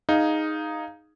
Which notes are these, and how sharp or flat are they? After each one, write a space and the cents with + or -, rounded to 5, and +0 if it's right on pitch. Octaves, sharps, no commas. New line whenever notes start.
D#4 +0 G#4 +0 F5 +0